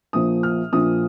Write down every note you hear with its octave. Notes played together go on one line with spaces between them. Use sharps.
A#1 A#2 F3 D#6
F6
A#1 A#2 F3 D#6